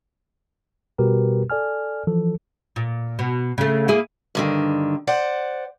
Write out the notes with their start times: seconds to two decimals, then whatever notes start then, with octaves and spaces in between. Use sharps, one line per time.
0.98 B2 G3 F#4 G4 A#4 B4
1.50 A4 D5 G#5 F6
2.07 E3 F3 A4
2.76 A#2
3.19 B2
3.58 C#3 A3
3.88 A#3 E4 G#4
4.35 G2 D3 D#3
5.07 C5 D5 F#5